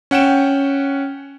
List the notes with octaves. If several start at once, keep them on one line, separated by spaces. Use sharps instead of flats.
C#4 F#5 G5 E7